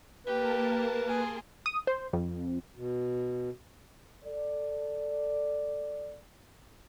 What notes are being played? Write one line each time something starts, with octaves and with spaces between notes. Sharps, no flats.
A#3 G4 A#4 B4 A5
G#4 C6
D#6
C5
F2
B2
A4 D5